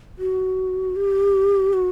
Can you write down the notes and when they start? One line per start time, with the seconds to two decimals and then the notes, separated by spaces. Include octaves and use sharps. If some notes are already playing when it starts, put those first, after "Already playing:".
0.18 F#4
0.96 G4
1.73 F#4